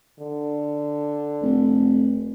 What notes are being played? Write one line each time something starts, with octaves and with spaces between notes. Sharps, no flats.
D3
F1